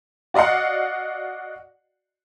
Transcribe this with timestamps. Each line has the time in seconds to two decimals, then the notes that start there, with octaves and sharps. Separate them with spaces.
0.34 F#4 D5 D#5 F5 F#5